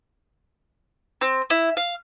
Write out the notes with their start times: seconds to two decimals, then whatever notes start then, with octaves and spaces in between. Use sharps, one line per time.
1.21 C4
1.50 E4
1.77 F5